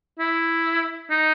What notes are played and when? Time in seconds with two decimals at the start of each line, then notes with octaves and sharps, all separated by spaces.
0.19 E4
1.10 D#4